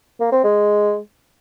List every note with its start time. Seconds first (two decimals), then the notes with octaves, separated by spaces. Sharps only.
0.20 A#3
0.32 C4
0.44 G#3